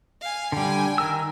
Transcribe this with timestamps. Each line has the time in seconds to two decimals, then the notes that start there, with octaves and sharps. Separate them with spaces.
0.22 F5 G#5
0.52 D3 G3 G5 G#5
0.98 D#3 A#4 E6